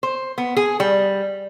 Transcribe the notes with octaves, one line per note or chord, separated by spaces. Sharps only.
C5
B3
G#4
G3